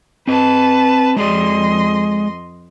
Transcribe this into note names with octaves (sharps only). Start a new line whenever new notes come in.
C4 B4 D#5 A5
F2 G#3 G#4 D5 D#5 C6